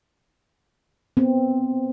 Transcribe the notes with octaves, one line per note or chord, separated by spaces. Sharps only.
B3 C4